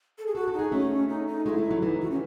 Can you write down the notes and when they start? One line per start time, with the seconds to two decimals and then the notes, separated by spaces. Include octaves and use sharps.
0.19 A4
0.27 G#4
0.35 F#4 A4
0.48 A4
0.53 D#4
0.59 G#4
0.72 A3 C#4
1.09 D#4
1.27 D#4
1.46 G#3 E4 F#4
1.58 A3
1.71 F#3
1.82 E3 D#4
2.01 D#3 F#4
2.11 C#4